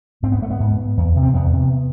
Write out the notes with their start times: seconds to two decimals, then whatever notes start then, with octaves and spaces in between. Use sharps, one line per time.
0.23 G#2 C4
0.32 B3
0.42 A3
0.50 B3
0.60 G#2
0.97 E2
1.16 C3
1.23 C4
1.34 E2 B3
1.53 C3